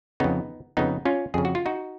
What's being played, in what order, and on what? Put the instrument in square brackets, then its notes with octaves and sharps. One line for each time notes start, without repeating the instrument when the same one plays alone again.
[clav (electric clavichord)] F2 C#3 B3 D#4
F2 C#3 B3 D#4
C#4 F4
F2 C#3 G#4
F#4
F4
D#4 F#4